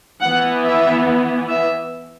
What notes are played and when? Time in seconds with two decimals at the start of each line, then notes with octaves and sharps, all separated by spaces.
0.21 E3 B3 F#5
0.63 E5
1.49 E5